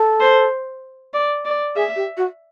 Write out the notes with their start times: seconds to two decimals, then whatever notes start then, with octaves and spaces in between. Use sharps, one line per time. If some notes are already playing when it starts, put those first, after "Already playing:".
Already playing: A4
0.20 C5
1.13 D5
1.45 D5
1.76 G#4 E5
1.96 G4
2.17 F#4